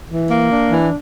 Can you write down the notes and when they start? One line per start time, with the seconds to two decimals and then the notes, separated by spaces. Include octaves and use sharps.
0.09 E3
0.30 A#3
0.50 D4
0.71 E3